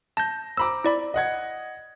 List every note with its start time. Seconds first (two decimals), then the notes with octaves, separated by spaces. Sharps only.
0.17 A5 G6 A#6
0.57 C5 A#5 B5 D6 E6
0.84 E4 D5 B5
1.14 D#5 F#5 G#6